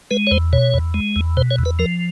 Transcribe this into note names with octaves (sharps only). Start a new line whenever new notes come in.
G#3 B4
C#5
E2 C5
B2 C#5
E2
G#3
E2
B2 C5
C#5
E2
B4
F3 A#4